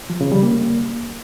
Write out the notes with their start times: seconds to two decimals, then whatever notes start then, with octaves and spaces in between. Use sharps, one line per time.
0.10 F3
0.21 C#3
0.32 G3
0.43 A#3